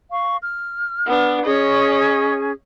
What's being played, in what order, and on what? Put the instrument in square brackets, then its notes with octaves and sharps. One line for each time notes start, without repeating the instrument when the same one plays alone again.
[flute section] F5 C#6
F6
[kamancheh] B3 D4
[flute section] C#4 G#4 G#5 [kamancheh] C#5 D#5